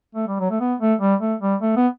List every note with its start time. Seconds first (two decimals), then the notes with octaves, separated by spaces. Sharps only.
0.15 A3
0.28 G3
0.40 F#3
0.50 A3
0.60 B3
0.80 A3
1.00 G3
1.20 A3
1.41 G3
1.61 A3
1.76 B3